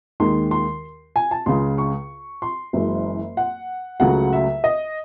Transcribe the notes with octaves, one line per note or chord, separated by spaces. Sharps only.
D#2 D#3 G#3 C6
C6
G#5
A5
C#2 C#3 G#3 C6
C#6
C6
F#1 F#2 E3 G#3
F#5
C#2 C#3 F#3 A3 F#5
E5
D#5